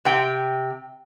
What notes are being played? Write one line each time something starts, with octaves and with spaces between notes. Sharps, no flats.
C3 G5